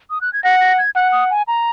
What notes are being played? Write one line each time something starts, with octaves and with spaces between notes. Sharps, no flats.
D#6
F#6
G#6
F#5 A#6
A#6
G#6
F#5 F#6
D#6
G#5
A#5